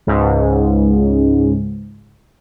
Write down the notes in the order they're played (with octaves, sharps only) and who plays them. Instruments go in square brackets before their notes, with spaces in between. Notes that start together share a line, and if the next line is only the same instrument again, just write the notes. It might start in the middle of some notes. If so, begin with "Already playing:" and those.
[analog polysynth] C#2 G#2